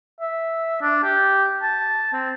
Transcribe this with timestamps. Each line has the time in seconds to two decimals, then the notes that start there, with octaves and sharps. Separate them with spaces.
0.21 E5
0.81 D4
1.03 G4
1.63 A5
2.13 C4